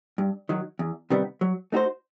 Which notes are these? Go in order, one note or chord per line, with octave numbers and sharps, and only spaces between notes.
G2
D#3 F#3
E2
C3 D#3 G3 B3
F#3
A3 D#4 F#4 C5